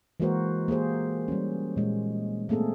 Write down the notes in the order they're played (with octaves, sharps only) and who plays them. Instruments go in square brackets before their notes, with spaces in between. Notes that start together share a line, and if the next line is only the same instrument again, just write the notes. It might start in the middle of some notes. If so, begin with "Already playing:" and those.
[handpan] E3 G#3 A#3 F#4 A#4 C5
A#3 G4 G#4 C5
G3 C#4
A#2 G#3
A3 A#3 C4 G#4 A4